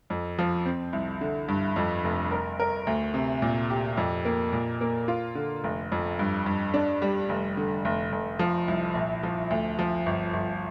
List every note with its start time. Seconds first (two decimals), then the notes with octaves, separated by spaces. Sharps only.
0.10 F2
0.39 F3
0.66 C4
0.93 C2
1.21 D3
1.48 G2
1.76 F2
2.04 F1
2.31 A#4
2.59 A#4
2.87 D2
3.14 C3
3.42 A#2
3.70 G4
3.97 F2
4.25 A#3
4.53 A#2
4.81 A#3
5.08 F4
5.35 D3
5.64 F1
5.92 F2
6.19 G2
6.46 G2
6.74 D4
7.02 G3
7.29 F1
7.57 D3
7.85 F1
8.12 F1
8.39 F3
8.68 C2
8.95 A#1
9.23 F3
9.50 D2
9.79 F3
10.06 G1
10.33 G1